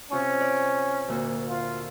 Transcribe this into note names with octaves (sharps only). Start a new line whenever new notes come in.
C3 C#4 F4 C#6
D5
D2 A#2 F#4
F4